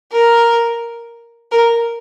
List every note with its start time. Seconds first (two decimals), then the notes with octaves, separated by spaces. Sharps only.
0.12 A#4
1.51 A#4